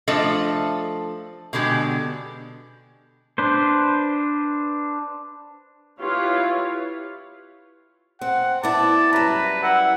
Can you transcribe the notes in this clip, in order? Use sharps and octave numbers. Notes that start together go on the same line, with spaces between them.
F3 A3 D4 A4 D#5
B2 D3 G#3 G4
D4 B4 C5
E4 F4 G4 B4 C#5 F5
C4 F#5
B3 E4 D5 A5
F#2 G3 B4 A#5
E4 F#5